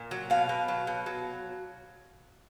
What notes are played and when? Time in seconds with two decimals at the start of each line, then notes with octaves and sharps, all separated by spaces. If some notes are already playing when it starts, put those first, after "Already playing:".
Already playing: A#2
0.11 F#3
0.30 B2 F5
0.49 B2
0.68 F#3
0.87 B2
1.06 F#3